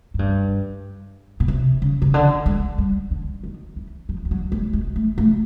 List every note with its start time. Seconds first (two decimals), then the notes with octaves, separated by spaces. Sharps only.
0.14 G#2
0.19 G2
1.40 B2
1.48 C3
1.82 C#3
2.02 C#3
2.14 D3
2.46 G#3
2.78 G3
3.11 D3
3.43 D#3
3.76 E3
4.09 F3
4.25 F3
4.31 F#3
4.52 G#3
4.73 G#3
4.96 A3
5.18 A3